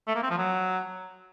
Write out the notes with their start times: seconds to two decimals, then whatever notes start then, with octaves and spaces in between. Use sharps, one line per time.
0.08 A3
0.15 A#3
0.23 C4
0.30 F3
0.38 F#3